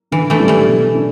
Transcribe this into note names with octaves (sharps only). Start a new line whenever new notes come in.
D3 E3
E3 A3
G3 D4
E3 A3
B2
D4